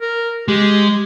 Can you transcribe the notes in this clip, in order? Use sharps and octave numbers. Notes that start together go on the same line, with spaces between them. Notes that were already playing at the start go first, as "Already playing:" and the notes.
A#4
G#3 G4